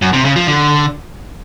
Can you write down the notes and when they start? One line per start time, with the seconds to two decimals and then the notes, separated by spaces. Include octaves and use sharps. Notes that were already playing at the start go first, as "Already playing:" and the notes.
0.02 F#2
0.13 C3
0.25 C#3
0.36 F3
0.48 D3